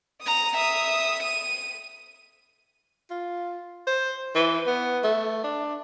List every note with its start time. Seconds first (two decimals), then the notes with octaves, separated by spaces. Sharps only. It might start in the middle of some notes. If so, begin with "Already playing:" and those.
0.22 A#5 D#6
0.57 E5 D#6
1.23 D#7
3.11 F4
3.87 C5
4.35 E3
4.67 B3
5.03 A3
5.44 D4